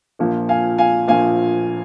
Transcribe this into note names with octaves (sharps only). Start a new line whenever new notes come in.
A#1 A#2 F3
F5 G#5
F5 G#5
A#1 A#2 F3 F5 G#5